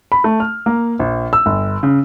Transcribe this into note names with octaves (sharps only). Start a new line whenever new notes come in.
B5
A3
F6
A#3
A#1
E6
G1
C#3